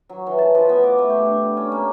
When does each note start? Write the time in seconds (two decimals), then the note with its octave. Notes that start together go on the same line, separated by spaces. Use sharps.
0.09 F#3
0.27 E3
0.39 A5
0.55 F3
0.69 B3
0.83 D6
0.99 A3
1.10 G4
1.26 D4
1.57 C#4
1.72 A#3